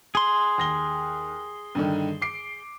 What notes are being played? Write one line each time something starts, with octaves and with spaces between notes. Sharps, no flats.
G#4 C6
D#2 A#6 G7
G2 D3 D#3
D6 C7 D7